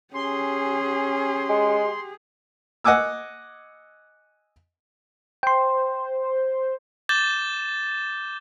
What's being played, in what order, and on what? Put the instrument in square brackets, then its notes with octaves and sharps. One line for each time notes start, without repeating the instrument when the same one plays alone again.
[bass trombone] C#4 [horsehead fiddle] G4 G#4 [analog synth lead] C6
[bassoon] G#3
[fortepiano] D#5 F#5 G#5 D6 E6
[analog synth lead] C5 [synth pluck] G5 C6
[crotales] D6 G6 A6 E7 G7